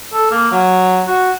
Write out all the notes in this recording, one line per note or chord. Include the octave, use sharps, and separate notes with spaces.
A4
A#3
F#3
F#4